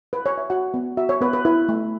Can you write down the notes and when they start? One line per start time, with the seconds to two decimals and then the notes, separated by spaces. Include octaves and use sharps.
0.13 B4
0.26 C#5
0.38 E5
0.50 F#4 F#5
0.74 B3
0.97 F#4 E5
1.09 C#5
1.21 B3 B4
1.33 B4
1.45 E4 B4
1.69 A3